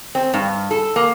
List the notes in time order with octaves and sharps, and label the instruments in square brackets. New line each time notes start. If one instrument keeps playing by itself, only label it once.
[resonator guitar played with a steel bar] C4
G2
A4
A#3